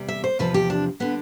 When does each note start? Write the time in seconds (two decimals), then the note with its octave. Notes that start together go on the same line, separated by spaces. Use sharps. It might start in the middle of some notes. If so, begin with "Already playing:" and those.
Already playing: E2 C3 G3
0.08 E5
0.24 C5
0.39 E2 C3 F3 B4
0.54 G4
0.70 D4
1.00 D3 G3 B3